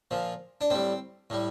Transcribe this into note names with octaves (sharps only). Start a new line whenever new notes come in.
A#2 F3
D4
A2 G3 C4
A2 G3